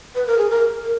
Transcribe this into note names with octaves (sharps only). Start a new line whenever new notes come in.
B4
A#4
G#4
A#4
A#4